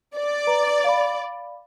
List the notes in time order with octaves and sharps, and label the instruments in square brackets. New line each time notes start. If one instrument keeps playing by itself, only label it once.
[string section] D5
[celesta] B4 A#5
F5 B5